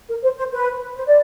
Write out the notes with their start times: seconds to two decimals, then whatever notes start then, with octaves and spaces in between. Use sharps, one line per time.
0.09 A#4
0.23 C5
0.37 C5
0.52 B4
0.95 C5
1.07 D5